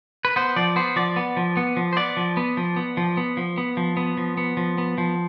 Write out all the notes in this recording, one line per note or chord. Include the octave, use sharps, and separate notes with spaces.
B4
B3 C5
F3 D5
B3 C5
F3 D5
B3
F3
B3
F3
C5
B3 D5
F3
B3
F3
B3
F3
B3
F3
B3
F3
B3
F3
B3
F3
B3
F3